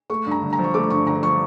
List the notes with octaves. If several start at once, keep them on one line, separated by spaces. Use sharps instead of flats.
A3 C#6
G2
A#5
G1
A#5
F3
C#6
A3 D6
G2 C#6
G1 A#5
F3 C#6